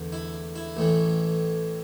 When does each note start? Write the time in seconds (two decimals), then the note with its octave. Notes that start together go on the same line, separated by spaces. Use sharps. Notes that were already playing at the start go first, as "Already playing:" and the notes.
Already playing: E2 D3 A3
0.12 E4
0.56 E4
0.77 A1 A2 E3